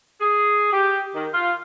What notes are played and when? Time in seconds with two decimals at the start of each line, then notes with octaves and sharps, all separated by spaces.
0.21 G#4
0.73 G4
1.15 D#3
1.34 F4